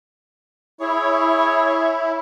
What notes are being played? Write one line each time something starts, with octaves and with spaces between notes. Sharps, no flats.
E4 G#4 C#5